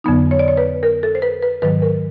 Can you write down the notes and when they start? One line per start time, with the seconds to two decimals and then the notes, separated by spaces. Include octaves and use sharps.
0.04 F2 D3 F#3 B3 D#4
0.31 C#5
0.39 D5
0.48 C#5
0.57 B4
0.83 A#4
1.03 A4
1.15 C5
1.22 B4
1.42 B4
1.62 G#2 D#3 F#3 B4
1.82 A#4